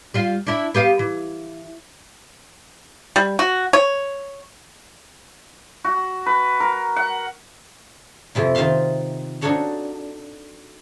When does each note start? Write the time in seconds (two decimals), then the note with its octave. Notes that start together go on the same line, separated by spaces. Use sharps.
0.14 G3 F4
0.47 D4 E4
0.74 B3 G4 F5
0.99 E3
3.16 G3
3.39 F#4
3.73 C#5
5.84 F#4
6.26 B4
6.60 A#4
6.96 F#5
8.35 F2 C3 E4 F4
8.55 D#3 F4 C5 E5 F5 C6
9.41 D4 D#4 F#4 A4 C#5 F5